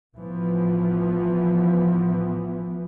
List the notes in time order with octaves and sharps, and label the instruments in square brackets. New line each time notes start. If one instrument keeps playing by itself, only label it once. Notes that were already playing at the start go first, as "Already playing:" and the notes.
[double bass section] A1 E3 F3 B3